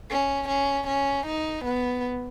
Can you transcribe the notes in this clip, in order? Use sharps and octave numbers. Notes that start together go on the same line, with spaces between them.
C#4
C#4
C#4
D#4
B3